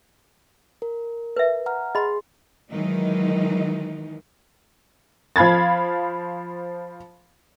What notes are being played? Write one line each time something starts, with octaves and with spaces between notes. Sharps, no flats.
A#4
B4 E5
F#5 A#5 F6
G#4 D#5 B5 C6
D#3 E3 F#3 G#3 D#4
F3 F5 B5 G#6 A6